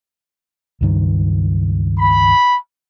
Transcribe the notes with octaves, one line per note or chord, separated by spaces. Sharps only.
C#2 G2 D#3
B5